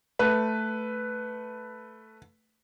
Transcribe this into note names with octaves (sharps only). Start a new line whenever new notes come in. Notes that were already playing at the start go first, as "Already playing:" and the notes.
A3 B4